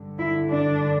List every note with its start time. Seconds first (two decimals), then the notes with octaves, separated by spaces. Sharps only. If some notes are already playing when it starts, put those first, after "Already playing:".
Already playing: G2 D3
0.19 E4
0.49 D4